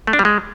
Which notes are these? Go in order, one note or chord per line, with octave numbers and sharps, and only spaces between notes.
A3
D4
G3
G#3